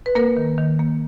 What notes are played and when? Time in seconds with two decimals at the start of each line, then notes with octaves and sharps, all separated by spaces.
0.06 B4
0.15 A#3 A#4
0.37 D#3
0.58 D#3
0.79 A#3